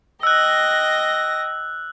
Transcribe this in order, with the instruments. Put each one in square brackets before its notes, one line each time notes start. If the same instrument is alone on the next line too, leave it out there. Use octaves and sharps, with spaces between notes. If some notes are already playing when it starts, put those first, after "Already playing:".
[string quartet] D#5 G5 A#6 [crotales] E6 F#6